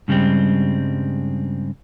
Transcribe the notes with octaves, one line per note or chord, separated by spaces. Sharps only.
G2 C#3 G3 G#3 C4